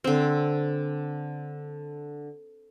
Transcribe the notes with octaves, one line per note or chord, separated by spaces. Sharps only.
D3 C4